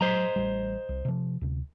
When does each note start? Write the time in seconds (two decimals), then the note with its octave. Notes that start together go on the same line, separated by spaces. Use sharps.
0.01 F#3 C5 D#5 A#5
0.36 A1 G3
0.89 C2
1.05 C3 F3
1.41 D2 C3